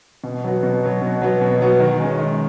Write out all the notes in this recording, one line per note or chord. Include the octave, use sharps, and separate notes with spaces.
B2
F#3 B3 F#4
B2
F#3 B3 F#4
B2
F#3 B3 F#4
B2
F#3 B3 F#4
D#3
G#3 C#4
D#3